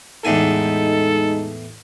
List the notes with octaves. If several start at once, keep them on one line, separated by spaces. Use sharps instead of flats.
E2 A2 G#3 D#4 A4 G#5